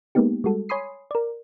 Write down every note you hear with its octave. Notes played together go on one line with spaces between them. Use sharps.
G#3 A#3 B3 D#4 G4
G3 G#3 F#4 A4
C#5 G#5 B5 C6 D#6 C7
A#4 D5